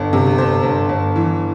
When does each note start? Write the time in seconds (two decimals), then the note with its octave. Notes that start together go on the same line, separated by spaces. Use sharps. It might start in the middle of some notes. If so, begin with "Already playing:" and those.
Already playing: G1
0.13 C3
0.38 G1 C5
0.63 G1
0.89 G1
1.16 E3